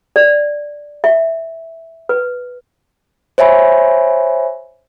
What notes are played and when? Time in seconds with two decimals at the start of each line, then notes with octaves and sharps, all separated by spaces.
0.16 D5
1.04 E5
2.09 B4
3.38 C5 C#5 E5 G#5 B5